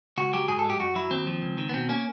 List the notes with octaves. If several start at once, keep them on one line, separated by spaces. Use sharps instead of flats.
C#2 F#4
F#3 G4
G#2 G#4
A4
G#3
G4
F#2 F#4
F#3 E4
D#2 C4
F3
C#2
D#3
B3
B2 C4
A#3 C#4